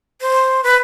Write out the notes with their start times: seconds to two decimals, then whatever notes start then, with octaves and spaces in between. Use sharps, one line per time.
0.21 C5
0.64 B4